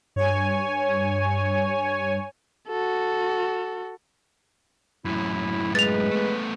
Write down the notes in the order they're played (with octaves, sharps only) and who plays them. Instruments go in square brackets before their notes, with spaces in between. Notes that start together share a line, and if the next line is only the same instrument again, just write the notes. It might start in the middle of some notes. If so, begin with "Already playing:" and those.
[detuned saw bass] G2 [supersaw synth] C#5 G#5
[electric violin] F#4 A4
[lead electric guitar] F#2 A2 [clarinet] E4
[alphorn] G#3 [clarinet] B4 [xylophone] A6 F7
[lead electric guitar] A3 B3